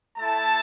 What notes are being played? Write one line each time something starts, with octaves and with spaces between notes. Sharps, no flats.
A3 E4 A4 A5